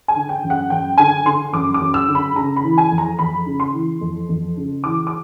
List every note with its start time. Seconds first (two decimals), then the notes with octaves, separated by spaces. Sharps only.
0.08 G#5
0.16 D3
0.29 G5
0.43 F#2
0.50 F#5
0.70 F#2 G5
0.98 D3 G#5
1.26 D3 C6
1.53 F#2 D6
1.74 D6
1.80 F#2
1.94 E6
2.08 D3
2.15 B5
2.35 C#3 A#5
2.56 B5
2.63 E3
2.78 G#5
2.91 F2
2.98 A#5
3.19 F2 B5
3.46 C#3
3.60 C6
3.73 E3
4.01 F2
4.29 F2
4.57 C#3
4.84 E3 D6
5.07 D6